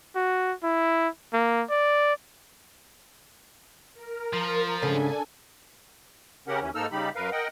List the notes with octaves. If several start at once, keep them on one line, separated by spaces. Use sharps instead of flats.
F#4
E4
A#3
D5
A#4
F3
G#2 C#3 A3 D4 A4 G#5
C#3 C#4 G4 A#4 F#5
D#2 E3 C#4
G#2 A#3 D#4 A4 E6 F6
C#3 G3 D#4 G4 B5
F#2 A#4 B4 F5
A#4 D#5 F#5 G5